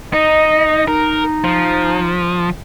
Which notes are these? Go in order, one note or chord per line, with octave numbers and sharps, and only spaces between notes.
D#4 D#5
D#4 A#4
F3